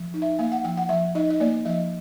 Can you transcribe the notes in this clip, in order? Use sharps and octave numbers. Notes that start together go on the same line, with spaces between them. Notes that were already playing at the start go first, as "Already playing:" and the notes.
Already playing: F3
D#4
E5
A#3 F5
F#5
F3 G5
F#5
F3 E5
D#4 D#5
D#5
A#3 D5
F3 D#5